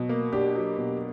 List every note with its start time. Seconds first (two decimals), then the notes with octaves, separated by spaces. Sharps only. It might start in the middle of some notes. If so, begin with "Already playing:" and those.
Already playing: B2 F#3
0.09 A#3
0.32 D4 G4
0.56 F#3
0.78 B2